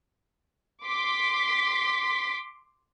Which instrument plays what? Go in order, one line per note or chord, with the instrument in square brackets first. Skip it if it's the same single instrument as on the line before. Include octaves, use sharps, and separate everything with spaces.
[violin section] C6 D6 B6